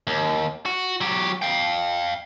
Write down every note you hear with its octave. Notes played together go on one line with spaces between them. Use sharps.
D#2
F#4
F#3 G4
F5 G5